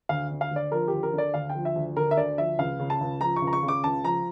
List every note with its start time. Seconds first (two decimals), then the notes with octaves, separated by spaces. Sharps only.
0.09 D2 F5
0.31 D3
0.41 F5
0.51 D2
0.56 D5
0.72 F3 A#4
0.88 D2 G4
1.03 A#4
1.13 D3
1.18 D5
1.34 D2 F5
1.50 G5
1.55 F3
1.65 E5
1.76 D2
1.96 D3 A#4
2.11 E5
2.17 D2 D5
2.38 F3 E5
2.59 C#2 F5
2.80 C#3
2.90 A5
3.01 C#2
3.21 F3 A#5
3.36 C#6
3.42 C#2
3.47 A#5
3.53 C#6
3.63 C#3
3.68 D6
3.84 C#2 A5
4.04 F3 A#5